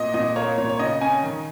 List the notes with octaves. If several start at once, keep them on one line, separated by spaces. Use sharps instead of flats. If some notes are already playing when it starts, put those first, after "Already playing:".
Already playing: A#2 D#5
A#2 D#5
A#3 C#5
A#2 C#5
C#5
C#3 D#5
C#4 G#5
D#3